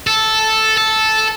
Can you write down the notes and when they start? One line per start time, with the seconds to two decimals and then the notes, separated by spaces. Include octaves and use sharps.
0.07 A4
0.78 A4